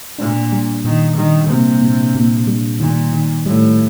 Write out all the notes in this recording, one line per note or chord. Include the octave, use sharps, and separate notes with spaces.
A#2 D4
G3
A#2 D#3
D#3 G3
C3 A#3
A#2
A#2
G3
A#2 D#3
D#3
A2 G3